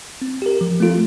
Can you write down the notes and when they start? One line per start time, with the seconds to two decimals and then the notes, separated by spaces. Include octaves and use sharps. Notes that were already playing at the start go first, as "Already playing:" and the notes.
0.22 C4
0.42 G4 A#4
0.61 F3
0.80 A3 C4 F4 A4